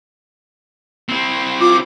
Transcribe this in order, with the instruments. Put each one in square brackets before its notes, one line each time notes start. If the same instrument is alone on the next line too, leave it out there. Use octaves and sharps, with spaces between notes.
[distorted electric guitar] C4 E4
[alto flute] F4 [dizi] D6